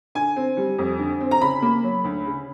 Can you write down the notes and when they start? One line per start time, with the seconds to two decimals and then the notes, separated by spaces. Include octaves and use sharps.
0.15 D3 G#5
0.36 C4
0.57 G3
0.79 F2
0.99 D3
1.21 C4
1.31 A#5
1.41 C#3 B5
1.62 A#3
1.83 F#3
2.04 D2
2.26 C#3